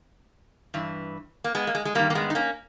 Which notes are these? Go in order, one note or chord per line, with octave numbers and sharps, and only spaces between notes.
G2 E3
A#3
G#3 B3
A#3
G#3
G#3
G2 D#3 G3 A#3
A#3
G#3 B3
D#4
A#3 C#4